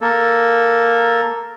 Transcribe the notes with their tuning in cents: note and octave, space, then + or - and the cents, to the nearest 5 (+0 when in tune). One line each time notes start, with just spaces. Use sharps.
A#3 +0 A4 +0